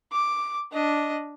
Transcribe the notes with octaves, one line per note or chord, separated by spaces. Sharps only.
D6
D4 D#5